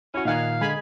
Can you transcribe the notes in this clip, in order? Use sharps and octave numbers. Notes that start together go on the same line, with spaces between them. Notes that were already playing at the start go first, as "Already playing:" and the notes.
C#4 E4 F#4
A#2 D#3 D#4 F5 F#5 G#5
D3 G#3 G#5 B5